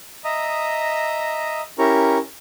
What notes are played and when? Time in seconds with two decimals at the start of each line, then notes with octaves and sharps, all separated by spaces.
0.24 D#5 E5 A#5 D#6
1.79 C#4 E4 G4 A#4 A#5 C#6